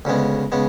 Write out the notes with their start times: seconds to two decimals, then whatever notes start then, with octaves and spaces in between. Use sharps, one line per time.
0.05 D2 C#3 G#3 B3
0.52 C#3 G#3 B3